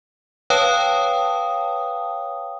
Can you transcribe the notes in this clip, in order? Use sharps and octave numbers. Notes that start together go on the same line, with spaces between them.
B4 C#5 F5 G5 A5 D#6